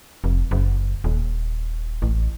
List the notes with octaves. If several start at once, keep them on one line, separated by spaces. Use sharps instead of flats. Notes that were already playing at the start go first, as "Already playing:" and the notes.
F1
F#1
D#1
A1